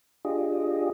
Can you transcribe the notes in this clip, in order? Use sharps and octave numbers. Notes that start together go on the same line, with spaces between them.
D4 F4 G4 G#4 D#5